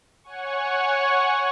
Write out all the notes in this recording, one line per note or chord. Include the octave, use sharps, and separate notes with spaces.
C#5 F#5 G#5 C#6